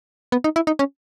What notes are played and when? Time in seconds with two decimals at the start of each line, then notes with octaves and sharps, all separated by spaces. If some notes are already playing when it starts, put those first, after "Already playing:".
0.32 B3
0.44 D#4
0.56 E4
0.67 D#4
0.79 C#4